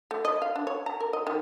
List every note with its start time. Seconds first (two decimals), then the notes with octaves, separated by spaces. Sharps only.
0.11 A3
0.25 D#5
0.42 F5
0.56 D4
0.67 C#5
0.86 A#5
1.00 A#4
1.13 D#5
1.27 D#3